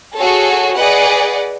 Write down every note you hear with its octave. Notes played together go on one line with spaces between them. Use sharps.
F#4 G#4 A4 C#5
G#4 B4 D5 D#5 F#5